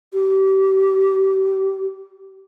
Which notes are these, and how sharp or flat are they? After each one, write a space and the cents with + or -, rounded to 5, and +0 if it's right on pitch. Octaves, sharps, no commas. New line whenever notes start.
G4 -30